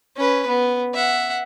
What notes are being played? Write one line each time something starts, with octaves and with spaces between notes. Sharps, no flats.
C#4 B4
B3
E5 F#5